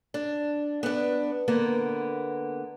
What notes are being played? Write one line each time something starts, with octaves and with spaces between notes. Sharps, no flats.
D4
B3 D4
D3 A#3 B3